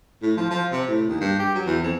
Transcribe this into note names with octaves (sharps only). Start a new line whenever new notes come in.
A2
F3
F3
C3
A2
D#2
G2
G4
F#3
E2
F2